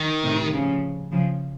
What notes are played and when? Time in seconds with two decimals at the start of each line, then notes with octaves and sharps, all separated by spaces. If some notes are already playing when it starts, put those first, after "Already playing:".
Already playing: D#3
0.23 A2 C3
0.52 C#3 F3
1.12 C#3 F3